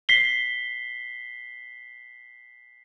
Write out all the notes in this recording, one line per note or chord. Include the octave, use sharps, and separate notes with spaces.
B6 C7 G7